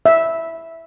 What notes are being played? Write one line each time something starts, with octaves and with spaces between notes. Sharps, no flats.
E5